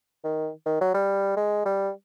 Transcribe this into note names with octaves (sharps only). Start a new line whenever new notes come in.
D#3
D#3
F#3
G3
G#3
G3